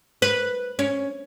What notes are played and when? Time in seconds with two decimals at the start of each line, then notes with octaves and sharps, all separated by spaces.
0.22 B4
0.79 C#4